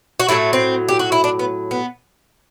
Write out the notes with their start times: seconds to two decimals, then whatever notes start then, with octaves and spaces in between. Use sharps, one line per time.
0.20 F#4
0.29 A2 F#3 A3 E4
0.53 C4
0.89 G4
0.99 F#4
1.12 E4
1.24 D4
1.39 B3
1.71 B3